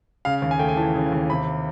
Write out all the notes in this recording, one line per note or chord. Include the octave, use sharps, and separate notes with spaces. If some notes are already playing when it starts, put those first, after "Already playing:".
C#3 F5
D#2
G#5
A3 G5
G#5
E3 A5
C#3
D#2
C3 B5